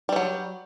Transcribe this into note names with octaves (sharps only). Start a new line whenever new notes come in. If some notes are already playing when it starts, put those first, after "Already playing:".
E3 F#3 G3